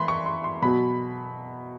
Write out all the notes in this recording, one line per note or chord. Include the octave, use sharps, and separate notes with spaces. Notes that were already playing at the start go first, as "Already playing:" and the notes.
Already playing: E3 B5 C6
C#6
C6
C6
B2 F#3 B5